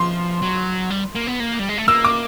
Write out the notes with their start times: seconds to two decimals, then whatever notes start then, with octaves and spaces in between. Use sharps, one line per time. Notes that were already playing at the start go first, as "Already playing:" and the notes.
Already playing: F3 C6
0.42 F#3
0.90 G3
1.15 A#3
1.27 B3
1.40 A#3
1.59 G3
1.69 G#3
1.78 A3
1.88 A#3 E6
2.05 D6